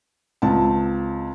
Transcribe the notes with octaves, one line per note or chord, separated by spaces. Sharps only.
C#2 C4 A5